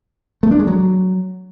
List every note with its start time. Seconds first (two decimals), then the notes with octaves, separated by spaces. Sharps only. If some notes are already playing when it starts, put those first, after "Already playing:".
0.43 A3
0.51 D4
0.59 G#3
0.67 F#3